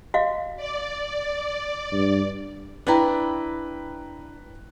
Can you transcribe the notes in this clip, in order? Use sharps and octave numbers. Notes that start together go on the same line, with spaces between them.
F#4 D#5 F5
D5
G2
D4 E4 B4 G5 A#5